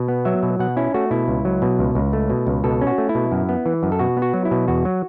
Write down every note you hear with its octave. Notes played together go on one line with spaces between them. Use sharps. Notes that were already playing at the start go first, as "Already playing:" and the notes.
Already playing: B2
B3
F#3 E5
B2
B2 F#5
C#4 E4
A3 F#4
B2 E4
C#2
F#3
B2
C#2
C#2
A3
B2
C#2
B2 A4
C#4
F#4
A3
E4
B2
F#2
B3
E3
F#2
A4
B2 F#4
B3
F#4
F#3
E4
B2
E2 F#4
F#3